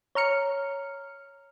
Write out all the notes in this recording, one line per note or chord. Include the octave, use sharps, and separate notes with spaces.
C#5 A#5 F6 C#7